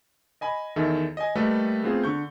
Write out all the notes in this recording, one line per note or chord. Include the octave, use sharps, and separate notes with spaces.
D#5 G#5 B5
E2 D#3 D#4 A4 D#5 E5
D#5 G#5
G3 A3 A#3 A4 B4 D#5
A3 B3 C4 F4 G#4
D3 C#6 G6